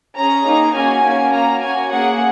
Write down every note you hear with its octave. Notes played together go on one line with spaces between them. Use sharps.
C#4 G#4 A#5
A#3 D#4 G#4
A#3 C#4 F#4 G#5
A#3 C#4 F#4
A#3 F#4 A#5
C#4 F#4 G#5
A#3 C#4 G#4 F#5